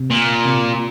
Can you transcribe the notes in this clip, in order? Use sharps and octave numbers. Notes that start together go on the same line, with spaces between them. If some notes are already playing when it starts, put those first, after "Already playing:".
Already playing: C3
A#2
C3